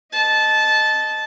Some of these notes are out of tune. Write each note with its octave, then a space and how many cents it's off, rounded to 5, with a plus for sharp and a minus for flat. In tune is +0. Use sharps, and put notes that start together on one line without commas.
D#5 -5 A5 -15